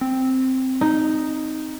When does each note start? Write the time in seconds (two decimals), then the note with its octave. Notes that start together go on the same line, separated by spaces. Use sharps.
0.01 C4
0.81 D#4